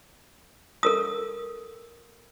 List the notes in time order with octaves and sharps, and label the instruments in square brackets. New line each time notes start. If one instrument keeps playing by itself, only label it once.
[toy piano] A4 A#4 D#6